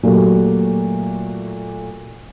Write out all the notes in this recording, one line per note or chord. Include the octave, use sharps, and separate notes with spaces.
A#2 F#3 A3 A#3 F#4 G4